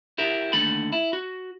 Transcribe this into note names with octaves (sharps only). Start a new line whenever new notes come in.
E4 G4 A#4
D#2 D3 A3 A4 B5
E4
F#4